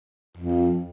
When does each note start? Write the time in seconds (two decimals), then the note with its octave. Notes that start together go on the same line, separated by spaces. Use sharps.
0.37 F2